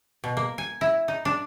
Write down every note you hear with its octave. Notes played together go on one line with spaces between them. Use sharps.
B2
A#3
G#5
E4
D#4
D4